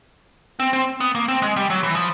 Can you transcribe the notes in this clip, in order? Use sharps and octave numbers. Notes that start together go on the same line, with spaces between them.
C4
C4
B3
A#3
C4
G#3
G3
F#3
E3
F3